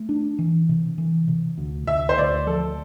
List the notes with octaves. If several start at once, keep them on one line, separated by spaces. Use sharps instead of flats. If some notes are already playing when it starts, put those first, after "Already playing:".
Already playing: A3
D4
E3
C3
E3
C3
D2
D2 E5
C5
D2 D5
F3 A4